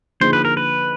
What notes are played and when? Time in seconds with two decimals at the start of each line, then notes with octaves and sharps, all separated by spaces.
0.20 D3 F3 A#3 D#4 G#4 C5
0.33 B4
0.45 A#4
0.57 B4